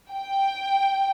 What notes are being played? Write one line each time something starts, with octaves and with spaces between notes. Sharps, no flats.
G5